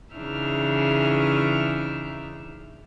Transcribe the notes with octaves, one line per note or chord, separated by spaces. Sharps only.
C#3 E3 D4 D#4 E5 F6